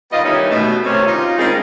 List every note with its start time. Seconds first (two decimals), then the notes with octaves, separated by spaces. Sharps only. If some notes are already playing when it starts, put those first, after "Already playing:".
0.12 D#3 G3 B3 F4 D#5
0.25 D#3 E3 G3 C#4 D#4 E4
0.50 B2 A3
0.85 C3 D#3 C4 C#4
1.06 D#4 F4
1.38 D#3 G3 G#3 A#3 C4 C#4